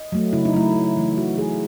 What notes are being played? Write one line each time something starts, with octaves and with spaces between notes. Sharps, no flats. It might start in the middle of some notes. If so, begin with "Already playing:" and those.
Already playing: D#5
F#3 A3
C#3 E4
D#4
F#3 A3 E4
C#3
E3 A3
C#3 F#4
E3 A3 G#4